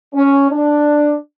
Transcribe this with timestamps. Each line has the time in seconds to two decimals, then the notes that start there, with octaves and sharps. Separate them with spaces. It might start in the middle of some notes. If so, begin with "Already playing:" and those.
0.15 C#4
0.51 D4